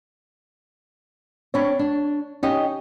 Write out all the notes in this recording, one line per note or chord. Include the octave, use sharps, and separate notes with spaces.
C4 D4 C#5 B5
D4
C#4 D#4 G4 D#5